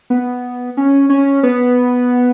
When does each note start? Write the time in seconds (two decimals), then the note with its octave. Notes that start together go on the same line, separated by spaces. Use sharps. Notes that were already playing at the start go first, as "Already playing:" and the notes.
0.10 B3
0.77 C#4
1.10 C#4
1.43 B3